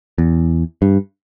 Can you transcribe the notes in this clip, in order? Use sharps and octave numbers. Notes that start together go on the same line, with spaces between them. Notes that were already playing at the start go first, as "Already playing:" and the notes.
E2
G2